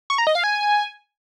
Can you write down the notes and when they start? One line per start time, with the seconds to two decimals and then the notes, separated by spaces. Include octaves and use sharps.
0.10 C#6
0.18 A#5
0.27 D#5
0.35 F5
0.44 G#5